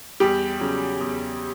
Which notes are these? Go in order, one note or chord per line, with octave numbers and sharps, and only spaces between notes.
E2 G3 G4
C#3 F#3
E2